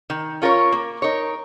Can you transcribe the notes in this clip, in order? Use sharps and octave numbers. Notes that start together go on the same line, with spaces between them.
D#3
C#4 F4 A#4 C#5
A#3
D#4 A#4 C#5